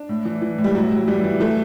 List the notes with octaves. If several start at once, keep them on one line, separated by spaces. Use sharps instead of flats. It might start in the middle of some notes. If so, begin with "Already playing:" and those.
Already playing: D4
A2
E3
E3
A2
G3
A2 F#3
A2
E3 G3
E3
E3 A3